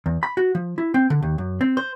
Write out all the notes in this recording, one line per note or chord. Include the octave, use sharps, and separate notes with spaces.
E2
B5
F#4
F3
E4
C4
D3
D#2
F#2
C4
C5